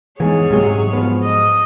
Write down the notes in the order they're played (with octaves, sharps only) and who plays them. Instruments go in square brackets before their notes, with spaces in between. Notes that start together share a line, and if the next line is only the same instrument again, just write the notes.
[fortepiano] E2 G#2 [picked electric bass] E3 [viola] G#4 C#5
[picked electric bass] G#2 G#3 [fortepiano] C3 F#3
[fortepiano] F3 B3
[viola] D#5